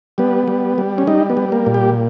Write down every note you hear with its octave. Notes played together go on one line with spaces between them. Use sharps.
G3 B3
G3
G3
C#4
G3 D#4
B3
G3
A#3
A#2
G4